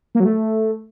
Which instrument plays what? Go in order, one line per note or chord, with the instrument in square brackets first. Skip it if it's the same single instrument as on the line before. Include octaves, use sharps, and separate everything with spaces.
[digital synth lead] A#3
F#3
A3